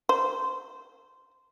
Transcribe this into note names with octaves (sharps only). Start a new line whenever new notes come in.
C5